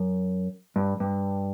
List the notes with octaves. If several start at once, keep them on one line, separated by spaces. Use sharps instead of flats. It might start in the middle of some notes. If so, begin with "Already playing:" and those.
Already playing: F#2
G2
G2